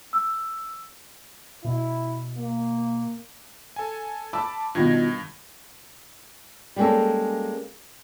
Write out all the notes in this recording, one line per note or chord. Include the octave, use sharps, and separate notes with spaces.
E6
B2 E4
A#3
A4 G#5
A5 B5 D6 E6
G2 B2 D#3 F3 G#6 A#6
G3 G#3 A#3 C#4 A4